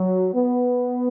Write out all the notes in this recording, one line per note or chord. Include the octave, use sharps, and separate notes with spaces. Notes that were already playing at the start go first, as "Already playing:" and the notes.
Already playing: F#3
B3